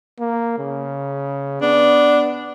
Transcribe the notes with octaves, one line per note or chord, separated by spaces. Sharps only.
A#3
C#3
B3 D4